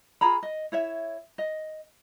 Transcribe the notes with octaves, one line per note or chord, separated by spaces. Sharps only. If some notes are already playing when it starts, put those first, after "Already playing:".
F4 G#4 A#5 B5
D#5
E4 C#5 E5
D#5